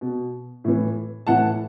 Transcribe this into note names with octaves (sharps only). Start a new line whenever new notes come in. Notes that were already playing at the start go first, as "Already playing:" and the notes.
B2
A2 E3
A2 E3 F#5 A5